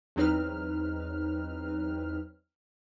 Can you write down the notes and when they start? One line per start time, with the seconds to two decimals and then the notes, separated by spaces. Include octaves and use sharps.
0.16 E2 F#3 C4 D#4 B4 F6